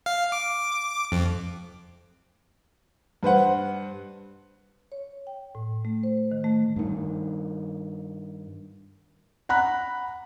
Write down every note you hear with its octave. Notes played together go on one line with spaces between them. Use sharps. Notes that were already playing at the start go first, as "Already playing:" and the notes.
F5
D6
F2
G2 B4 C5 F#5
C#5
G5
A2
A3
C5
D#3
A3
G2 D#3
F#5 A#5 B5 F#6